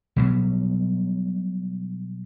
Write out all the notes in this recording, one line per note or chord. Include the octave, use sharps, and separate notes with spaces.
B2 F#3 G3